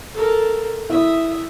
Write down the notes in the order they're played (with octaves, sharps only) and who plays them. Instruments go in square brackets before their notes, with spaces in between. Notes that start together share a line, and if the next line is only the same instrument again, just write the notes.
[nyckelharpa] A4 A#4
[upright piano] E4 [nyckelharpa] E5 D#6